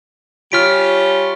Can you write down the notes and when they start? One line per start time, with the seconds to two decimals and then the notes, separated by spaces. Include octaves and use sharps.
0.52 G3 C#4 F4 F6 B6 D7